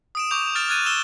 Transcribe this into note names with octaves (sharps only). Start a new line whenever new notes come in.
D#6 D7 E7
C#6 D6 G6 F7
F6 A6 D7 E7
F6 F#6 G#6 A6 D#7
E6 E7 G7